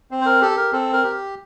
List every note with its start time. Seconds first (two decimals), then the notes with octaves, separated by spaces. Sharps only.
0.11 C4
0.21 C5
0.26 A#4
0.41 G4 A4
0.57 A#4
0.72 C4 A4
0.93 A#4
1.04 G4